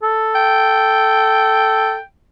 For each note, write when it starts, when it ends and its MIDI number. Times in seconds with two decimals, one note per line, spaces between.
0.03 1.97 69
0.35 2.02 79